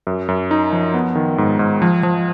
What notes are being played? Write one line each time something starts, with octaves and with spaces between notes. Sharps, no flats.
F#2
F#2
D#4
F3
B3
D#3
G#2
G#2
F3
F3